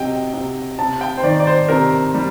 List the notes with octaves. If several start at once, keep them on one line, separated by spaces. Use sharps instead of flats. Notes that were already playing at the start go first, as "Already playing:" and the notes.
Already playing: C3 F#3 D#5 G5
C3
C3 A5
G5
C5
D#3 D5
D5
C5
C3 A#4
G3